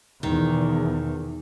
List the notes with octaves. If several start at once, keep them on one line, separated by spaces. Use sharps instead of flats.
E2 B2 D#3